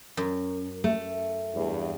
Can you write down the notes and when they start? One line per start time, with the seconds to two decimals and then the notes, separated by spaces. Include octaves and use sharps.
0.17 F#2
0.84 A3
1.54 E2 G2